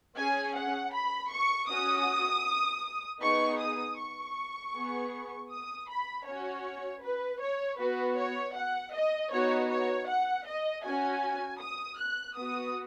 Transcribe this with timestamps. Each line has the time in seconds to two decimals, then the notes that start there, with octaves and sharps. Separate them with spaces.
0.16 C#4 G#4 G#5
0.55 F#5
0.93 B5
1.31 C#6
1.69 C#4 F#4 D#6
3.21 B3 D#4 G#4 C#6
3.60 D#6
3.98 C#6
4.74 B3 G#4
5.50 D#6
5.89 B5
6.26 C#4 F#4 C#5
7.03 B4
7.41 C#5
7.79 B3 F#4 B4
8.17 C#5
8.55 F#5
8.93 D#5
9.32 B3 D#4 F#4 C#5
9.70 C#5
10.08 F#5
10.46 D#5
10.84 C#4 F#4 G#5
11.61 D#6
11.99 F#6
12.36 B3 F#4 D#6